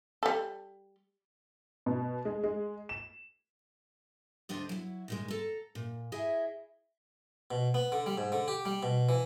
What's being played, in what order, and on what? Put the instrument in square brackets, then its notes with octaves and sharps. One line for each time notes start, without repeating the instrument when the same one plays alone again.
[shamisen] G3 A4
[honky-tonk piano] B2
G#3
G#3
E7
[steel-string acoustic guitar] D2 B3 D4 C5 D#5
F#3 E4
A#2 D#3 G#3
A4 A#5
A#2
E4 G#4 D#5 E5
[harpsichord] B2
B3
D3
G3
G#2
D3
G4
G3
B2
E3